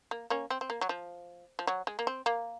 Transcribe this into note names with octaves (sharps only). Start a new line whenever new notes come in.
A#3
A#3 C#4
C4
C4
A#3
F#3
F3
F3
F#3
G#3
A#3
C4
A#3